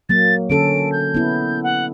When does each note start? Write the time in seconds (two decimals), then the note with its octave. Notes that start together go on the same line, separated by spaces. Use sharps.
0.09 F#3 A#3 A6
0.50 D3 C#4 A4 D7
0.92 G6
1.14 B3 E4
1.63 F#5